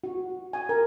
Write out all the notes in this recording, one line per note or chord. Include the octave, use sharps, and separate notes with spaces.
F#4
G#5
A#4